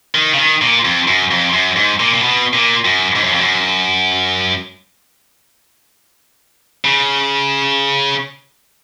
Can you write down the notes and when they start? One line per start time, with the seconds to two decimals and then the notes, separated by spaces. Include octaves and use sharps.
0.15 D#3
0.33 C#3
0.38 D#3
0.62 A#2
0.85 F2
1.08 F#2
1.31 F2
1.53 F#2
1.76 G#2
2.00 A#2
2.14 A#2
2.23 B2
2.53 A#2
2.85 F#2
3.16 G#2
3.24 F#2
3.33 F2
3.41 F#2
6.85 C#3